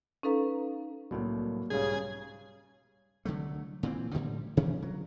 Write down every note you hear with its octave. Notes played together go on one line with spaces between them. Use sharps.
C#4 D#4 A4 B4 F5 A#5
C2 A2 F#3 A#3
B1 G#2 C#3 G3 C#4 G#4
C2 D3 F#3 A3
A#2 E3 C4
A2 D3 F3 G3
B2 E3 F#3 C#4
F#3